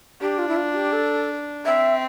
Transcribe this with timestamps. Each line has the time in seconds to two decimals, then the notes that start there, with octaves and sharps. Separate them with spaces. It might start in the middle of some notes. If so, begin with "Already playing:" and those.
0.21 D4 G4
0.38 F4
0.48 E4
0.56 F4
0.75 G4
0.93 A4
1.65 C4 E5